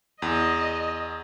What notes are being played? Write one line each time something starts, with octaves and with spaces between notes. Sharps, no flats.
E2 D#5